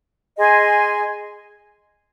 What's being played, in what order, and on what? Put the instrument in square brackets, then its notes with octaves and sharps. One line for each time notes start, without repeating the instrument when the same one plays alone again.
[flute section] G#4 D#5 G#5 C6